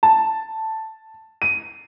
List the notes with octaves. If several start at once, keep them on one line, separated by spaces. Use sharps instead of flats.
A5
D#7